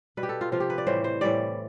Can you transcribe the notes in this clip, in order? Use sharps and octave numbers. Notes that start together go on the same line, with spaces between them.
B2 G3 B4
G4
A4
F4
C3 F3 F4
G4
B4
D5
A2 E3 G3 C5
C5
A2 E3 G3 D5